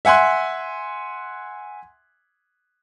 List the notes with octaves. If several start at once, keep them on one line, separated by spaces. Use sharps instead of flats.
E5 F#5 G#5 C6 F#6